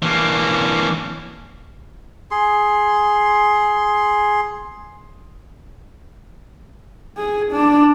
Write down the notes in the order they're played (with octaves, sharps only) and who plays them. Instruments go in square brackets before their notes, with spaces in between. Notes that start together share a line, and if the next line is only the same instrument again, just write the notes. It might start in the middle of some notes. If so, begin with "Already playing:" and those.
[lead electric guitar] E3 A#3 [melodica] C#4 D4
[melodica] G#4 C6
[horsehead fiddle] G#4
D4